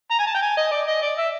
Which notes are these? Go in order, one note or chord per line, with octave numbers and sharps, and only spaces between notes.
A#5
G#5
A5
G5
G#5
D#5
D5
D#5
D5
E5